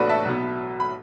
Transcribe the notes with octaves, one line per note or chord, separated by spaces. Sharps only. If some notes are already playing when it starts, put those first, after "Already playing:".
Already playing: A1 A2 B3 D4 F#4 A4 B4 D5
E5 A5
B1 B2 B3
B5